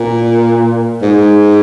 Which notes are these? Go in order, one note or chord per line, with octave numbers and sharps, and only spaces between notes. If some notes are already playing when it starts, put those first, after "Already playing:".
Already playing: A#2
G#2